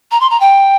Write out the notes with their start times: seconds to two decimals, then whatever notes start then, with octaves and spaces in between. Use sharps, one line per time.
0.11 A#5
0.20 C6
0.30 A#5
0.40 G5